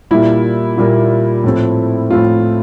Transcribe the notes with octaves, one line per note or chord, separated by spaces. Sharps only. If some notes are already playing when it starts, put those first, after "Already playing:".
A#2 G3 A#3 E4
A#2 G3 A#3
A2 F3 A3 C4
A2 F3 A3 C4 F4